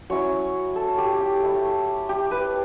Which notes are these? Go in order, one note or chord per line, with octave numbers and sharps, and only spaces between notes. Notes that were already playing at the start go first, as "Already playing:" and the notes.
F#3 C#4 E4 C#5
A4
G4
G4
A3 E4
G4
B4